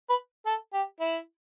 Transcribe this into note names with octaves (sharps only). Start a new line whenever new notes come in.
B4
A4
G4
E4